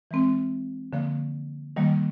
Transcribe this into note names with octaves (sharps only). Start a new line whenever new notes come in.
E3 G#3 C4
D3 F3 A#3
D#3 G3 A#3